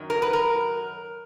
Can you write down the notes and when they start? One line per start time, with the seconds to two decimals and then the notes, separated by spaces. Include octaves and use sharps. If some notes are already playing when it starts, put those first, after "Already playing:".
Already playing: F#2 D#3 F#3
0.10 A#4
0.22 B4
0.33 A#4